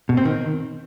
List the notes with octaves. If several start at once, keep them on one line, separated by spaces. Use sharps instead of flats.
B2
C4
D#3